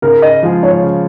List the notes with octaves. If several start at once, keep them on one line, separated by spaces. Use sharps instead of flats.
C#3 A#4
D#5
F3 G#3 F4 G#4
C#5
C#3